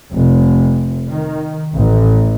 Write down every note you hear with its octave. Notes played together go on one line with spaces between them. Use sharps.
F1
D#3
A1